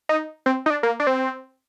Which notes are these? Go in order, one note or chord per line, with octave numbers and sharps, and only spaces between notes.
D#4
C4
D#4
D4
A#3
D4
C4